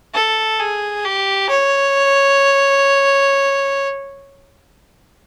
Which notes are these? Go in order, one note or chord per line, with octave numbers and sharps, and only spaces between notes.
A4
G#4
G4
C#5